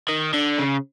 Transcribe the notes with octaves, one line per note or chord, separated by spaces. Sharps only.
D#3
D3
C#3